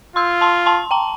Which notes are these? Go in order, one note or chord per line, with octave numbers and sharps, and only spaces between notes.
F4 C6 E6
A5 C6
A5 C6
G5 A#5